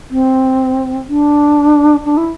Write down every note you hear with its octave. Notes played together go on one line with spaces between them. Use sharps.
C4
D4
D4
E4